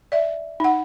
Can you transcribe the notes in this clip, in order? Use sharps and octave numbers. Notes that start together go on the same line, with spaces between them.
D5 E5
D#4 F#5